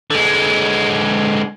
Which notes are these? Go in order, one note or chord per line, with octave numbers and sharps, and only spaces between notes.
D3 G#3